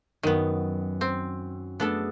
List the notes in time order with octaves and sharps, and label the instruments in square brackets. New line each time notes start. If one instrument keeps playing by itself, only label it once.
[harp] F#2 [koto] D#3 B3
[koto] C4
[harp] A3 G#4 [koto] B3 D4 A4